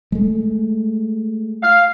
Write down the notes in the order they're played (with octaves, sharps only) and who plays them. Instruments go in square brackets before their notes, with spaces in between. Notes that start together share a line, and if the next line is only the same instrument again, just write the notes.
[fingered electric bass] G#3 A3
[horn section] F5